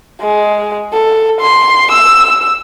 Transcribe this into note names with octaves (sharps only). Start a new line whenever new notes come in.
G#3
A4
C6
E6